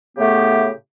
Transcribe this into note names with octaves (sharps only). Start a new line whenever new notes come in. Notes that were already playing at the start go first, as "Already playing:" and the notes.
A2 C#3 A3 B3 G4